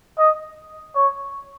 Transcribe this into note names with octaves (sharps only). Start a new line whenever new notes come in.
D#5
C#5